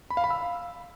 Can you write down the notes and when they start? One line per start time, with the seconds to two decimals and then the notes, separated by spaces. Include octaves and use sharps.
0.10 B5
0.17 F5
0.24 B5
0.31 E6